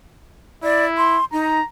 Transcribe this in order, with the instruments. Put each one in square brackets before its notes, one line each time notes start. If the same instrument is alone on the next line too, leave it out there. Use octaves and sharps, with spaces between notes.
[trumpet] E4 [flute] D5
[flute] C6
[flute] D#4 [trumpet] A#5